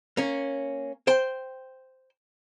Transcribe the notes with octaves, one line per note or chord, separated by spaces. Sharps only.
A#3 C#4
C5 G5